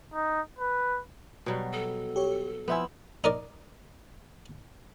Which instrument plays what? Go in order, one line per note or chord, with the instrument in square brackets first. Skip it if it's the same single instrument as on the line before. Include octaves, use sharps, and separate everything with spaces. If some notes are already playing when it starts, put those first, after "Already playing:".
[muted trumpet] D#4
B4
[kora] B2 F#3 G3
[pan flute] A4
[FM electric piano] G4 C#5
[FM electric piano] F3 E5 G#5 [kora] B3 C4 E4
[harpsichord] D#4 A#4 D5